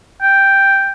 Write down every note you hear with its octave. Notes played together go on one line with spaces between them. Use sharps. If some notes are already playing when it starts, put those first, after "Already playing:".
G5